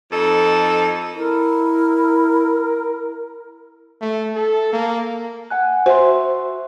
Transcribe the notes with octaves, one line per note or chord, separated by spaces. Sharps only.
F2 D#4 A4
E4 A#4
A3
A4
A#3
F#5 G#5 F#6
F#4 C5 E5 C6